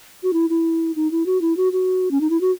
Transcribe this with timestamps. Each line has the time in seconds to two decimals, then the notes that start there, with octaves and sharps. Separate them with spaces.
0.23 F#4
0.33 E4
0.50 E4
0.96 D#4
1.11 E4
1.26 F#4
1.41 E4
1.57 F#4
1.72 F#4
2.11 C#4
2.21 D#4
2.30 E4
2.41 F#4